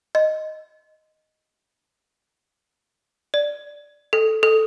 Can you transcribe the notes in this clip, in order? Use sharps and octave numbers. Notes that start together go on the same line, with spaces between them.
D#5
D5
A4
A4